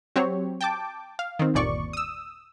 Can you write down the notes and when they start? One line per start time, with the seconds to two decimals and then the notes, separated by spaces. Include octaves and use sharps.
0.16 F#3 C4 G4 C#5
0.61 G5 A5 D6
1.19 F5
1.39 D#3 C4
1.54 G1 D#2 A#2 D5 C#6
1.93 D#6 E6